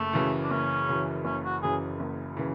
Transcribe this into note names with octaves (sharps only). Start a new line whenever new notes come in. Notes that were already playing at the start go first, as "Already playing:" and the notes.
Already playing: F#1 A3
F#2 C#3 E3
D4
F#1 C#4
F#2 C#3 E3
F#1 C#4
F#4
F#2 C#3 E3 G#4
F#1
C#3 E3